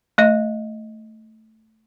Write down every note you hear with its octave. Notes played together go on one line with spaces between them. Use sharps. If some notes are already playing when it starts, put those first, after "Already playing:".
A3 D#5